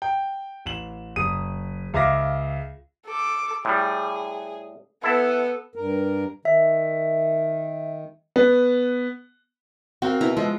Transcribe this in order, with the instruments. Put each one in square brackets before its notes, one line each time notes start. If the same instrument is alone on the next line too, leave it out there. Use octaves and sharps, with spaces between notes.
[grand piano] G5
A1 E7 F#7
F#1 D#6 D#7
C#2 E5 F5 D6 A#6
[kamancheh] A4 D6
[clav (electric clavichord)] A2 G3 [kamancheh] G#4
[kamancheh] B3 A4 [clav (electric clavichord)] E4 A5
[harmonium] G2 A#4
[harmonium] D#3 [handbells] E5
[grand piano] B3
[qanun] C4 [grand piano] F#4 A#4 F5
[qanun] B2 E4 A#5
[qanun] F3 [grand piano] G#3